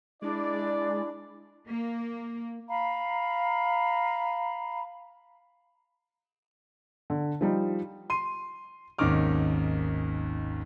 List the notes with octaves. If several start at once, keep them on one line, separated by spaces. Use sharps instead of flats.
G#3 D4 E4 D5
A#3
F5 A#5 B5
D3
F3 G3 D#4
C6 D#7
G#1 D#2 C#4 D#4 D6 F6